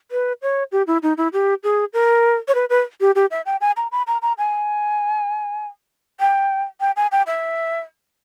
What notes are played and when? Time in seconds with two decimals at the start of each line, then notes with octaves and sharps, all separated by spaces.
0.11 B4
0.42 C#5
0.72 G4
0.87 E4
1.03 D#4
1.17 E4
1.33 G4
1.63 G#4
1.93 A#4
2.48 C#5
2.55 B4
2.70 B4
3.01 G4
3.15 G4
3.31 E5
3.46 G5
3.61 G#5
3.77 A#5
3.92 B5
4.07 A#5
4.22 A#5
4.38 G#5
6.20 G5
6.81 G5
6.96 G#5
7.12 G5
7.27 E5